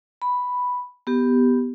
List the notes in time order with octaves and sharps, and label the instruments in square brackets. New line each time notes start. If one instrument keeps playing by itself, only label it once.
[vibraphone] B5
B3 G4